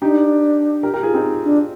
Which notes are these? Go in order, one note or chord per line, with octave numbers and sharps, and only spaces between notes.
D4 D#4 G4
G4 A#4
G4 A#4
F4 G#4
C4 D#4
D4